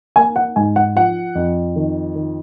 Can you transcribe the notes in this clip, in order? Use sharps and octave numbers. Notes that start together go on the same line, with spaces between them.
A#3 G#5
F#5
G#2 G#5
F#5
F3 F#5
F2
D#3
D#3